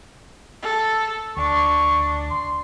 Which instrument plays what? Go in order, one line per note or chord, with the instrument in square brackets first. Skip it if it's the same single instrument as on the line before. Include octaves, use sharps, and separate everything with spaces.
[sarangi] A4
[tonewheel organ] D2 [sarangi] D4 [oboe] C#6
[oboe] C6